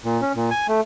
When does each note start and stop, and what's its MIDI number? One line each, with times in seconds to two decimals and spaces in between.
0.05 0.21 46
0.22 0.32 61
0.35 0.50 46
0.51 0.67 80
0.68 0.81 57